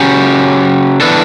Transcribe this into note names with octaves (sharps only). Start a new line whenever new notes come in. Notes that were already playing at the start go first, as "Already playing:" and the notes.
Already playing: C#3 F#3 C#4 G4
E3 B3 D4 A4